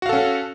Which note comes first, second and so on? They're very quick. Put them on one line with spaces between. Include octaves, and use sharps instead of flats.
F#4 F5 A4 C#4